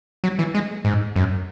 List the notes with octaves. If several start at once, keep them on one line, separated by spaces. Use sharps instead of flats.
F#3
E3
G#3
G#2
F#2